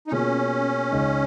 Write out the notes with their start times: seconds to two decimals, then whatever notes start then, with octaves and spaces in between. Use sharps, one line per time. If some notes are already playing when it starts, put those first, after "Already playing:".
0.07 D#4
0.11 B2 A#3 C#4 F4 G#4 C#5
0.91 C#2 C#3 G#3 D#4